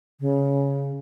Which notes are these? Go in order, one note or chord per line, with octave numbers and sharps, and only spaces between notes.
C#3